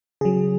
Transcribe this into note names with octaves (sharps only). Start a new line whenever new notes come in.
C#3 F#3 G#4